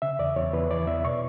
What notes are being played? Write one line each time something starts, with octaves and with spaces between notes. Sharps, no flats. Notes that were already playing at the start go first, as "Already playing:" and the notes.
C#3 E5
E2 D5
E2 C#5
E2 B4
E3 D5
E2 E5
B2 C#6